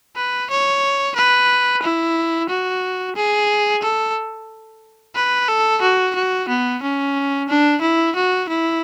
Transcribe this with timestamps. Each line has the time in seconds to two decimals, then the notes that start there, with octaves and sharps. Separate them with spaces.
0.16 B4
0.50 C#5
1.16 B4
1.82 E4
2.49 F#4
3.16 G#4
3.83 A4
5.15 B4
5.48 A4
5.82 F#4
6.15 F#4
6.48 B3
6.82 C#4
7.48 D4
7.81 E4
8.15 F#4
8.49 E4